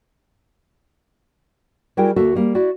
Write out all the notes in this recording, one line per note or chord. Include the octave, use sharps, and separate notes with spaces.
G3 E4 F#4 G#4 A#4 G5
D2 A#3 F#4 A4 E5
G3 A#3
E4 F#4 D5